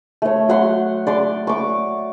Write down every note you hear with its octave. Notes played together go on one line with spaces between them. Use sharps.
A3 C#5
F#3 F#5 C6
D5 C6 D6
C#6 D6